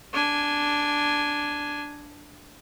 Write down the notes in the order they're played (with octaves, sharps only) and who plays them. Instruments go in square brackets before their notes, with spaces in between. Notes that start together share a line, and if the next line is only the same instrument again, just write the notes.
[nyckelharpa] D4 G#5